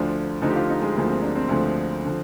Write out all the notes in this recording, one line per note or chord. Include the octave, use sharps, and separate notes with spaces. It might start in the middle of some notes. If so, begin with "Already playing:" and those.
Already playing: D2 D3 F3 D4
D2 D3 F3 D#4
G4
F4
D#4
G#3
D2 D3 F3 A#3
C4
D4
C4
D2 D3 F3
D3 F3